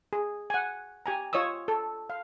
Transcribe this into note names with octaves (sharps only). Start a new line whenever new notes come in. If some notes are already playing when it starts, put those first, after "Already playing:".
G#4
F#5 G#5
G4 G#5 A#5
F4 C#5 D#5 D#6 E6
A4
F5